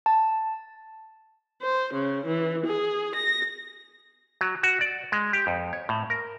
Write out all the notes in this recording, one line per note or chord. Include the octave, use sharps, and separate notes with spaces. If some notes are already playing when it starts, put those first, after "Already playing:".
A5
C5
C#3
E3
G#4
A#6
F#3
F#4
D5
G#3
G4
F2
C#5
A2
A#4